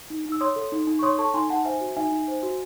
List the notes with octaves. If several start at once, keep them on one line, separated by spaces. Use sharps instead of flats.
D#4
D#4
E6
C#5 C6 D#6
A4
D#4
D#4
C#6
C#5 C6 D#6
A4 A5 C#6
D#4 G#5 C6
D#4 F#5 A5
C5 E5 G#5
F#4
D#4 E5 G#5
D#4
C5
F#4